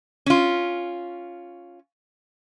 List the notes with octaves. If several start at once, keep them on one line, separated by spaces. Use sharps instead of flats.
C#4 F4